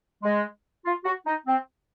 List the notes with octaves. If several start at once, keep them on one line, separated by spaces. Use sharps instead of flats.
G#3
F4
F#4
D#4
C4